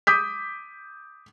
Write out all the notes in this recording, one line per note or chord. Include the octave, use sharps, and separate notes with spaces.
D6 D#6 G6 B6